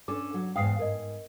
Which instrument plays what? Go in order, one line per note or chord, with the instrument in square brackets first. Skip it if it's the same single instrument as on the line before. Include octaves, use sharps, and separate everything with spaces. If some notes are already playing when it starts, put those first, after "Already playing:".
[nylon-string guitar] C#4 D4 A4 [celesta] D6
[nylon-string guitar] F#3
[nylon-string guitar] E2 G#2 F5 [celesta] G5 D#6 C7
[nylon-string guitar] G#2 [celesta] A#4 D#5